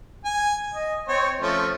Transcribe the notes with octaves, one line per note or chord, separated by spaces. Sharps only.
G#5
D#5
C4 C#5
F3 A3 C#4